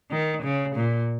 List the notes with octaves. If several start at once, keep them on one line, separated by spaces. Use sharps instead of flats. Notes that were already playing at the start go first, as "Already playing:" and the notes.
D#3
C#3
A#2